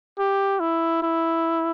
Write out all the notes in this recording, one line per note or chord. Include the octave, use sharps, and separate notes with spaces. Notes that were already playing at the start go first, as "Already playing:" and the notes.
G4
E4
E4